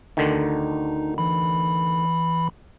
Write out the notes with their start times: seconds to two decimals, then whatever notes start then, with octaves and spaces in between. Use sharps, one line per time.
0.17 D2 D3 D#3 D#4
1.18 E3 B5